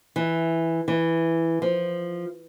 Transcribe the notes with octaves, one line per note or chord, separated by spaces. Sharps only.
E3
E3
F3